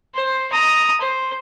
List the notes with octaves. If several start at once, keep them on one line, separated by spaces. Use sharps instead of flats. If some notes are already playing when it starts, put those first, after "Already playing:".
C5
A#5 D#6
C5